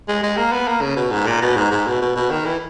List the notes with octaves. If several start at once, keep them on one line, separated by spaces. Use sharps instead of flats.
G#3
G#3
A#3
B3
A#3
C#3
B2
G#2
A#2
B2
G#2
G#2
B2
B2
B2
D#3
E3